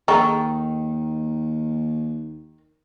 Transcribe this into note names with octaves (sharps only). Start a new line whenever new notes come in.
D#2 D#3 G#3 D#4 A4 A#5 C#6